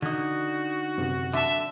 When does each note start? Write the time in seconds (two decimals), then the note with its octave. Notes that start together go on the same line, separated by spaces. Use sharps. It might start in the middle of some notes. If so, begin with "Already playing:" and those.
0.02 D3 D#4 F#4
0.98 F#2 C3
1.33 D3 E5 A5